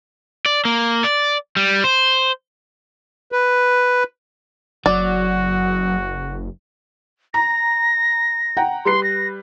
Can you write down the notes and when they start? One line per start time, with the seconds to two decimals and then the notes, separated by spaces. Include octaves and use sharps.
0.46 D5
0.65 A#3
1.04 D5
1.57 G3
1.84 C5
3.32 B4
4.86 F#1 F#3 F#4 D5
7.34 A#5 A#6
8.57 F#5 G5 A#5
8.85 G3 B4 C6 C7
9.04 A#6